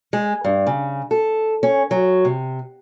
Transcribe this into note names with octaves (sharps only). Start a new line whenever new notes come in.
G#3
G2
C#3
A4
C#4
F#3
C3